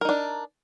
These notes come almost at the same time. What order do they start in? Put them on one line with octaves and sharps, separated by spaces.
A#4 D#4 D4